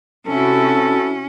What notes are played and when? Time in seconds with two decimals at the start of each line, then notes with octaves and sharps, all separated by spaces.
0.28 C3 C#4 E4 F#4 A4